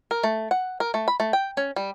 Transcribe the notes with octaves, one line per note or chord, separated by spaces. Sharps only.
A#4
A3
F#5
A#4
A3
B5
A3
G5
C#4
G3